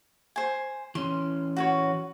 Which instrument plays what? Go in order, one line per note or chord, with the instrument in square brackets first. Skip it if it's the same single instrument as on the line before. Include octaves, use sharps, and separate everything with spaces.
[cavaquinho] C5 G#5
[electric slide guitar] E3 C#4 [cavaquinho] C6
[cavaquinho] F#4 B4 C#5